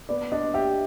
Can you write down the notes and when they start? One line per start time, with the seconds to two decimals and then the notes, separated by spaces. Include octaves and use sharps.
0.09 B3 D5
0.31 D4 D#5
0.54 G4 E5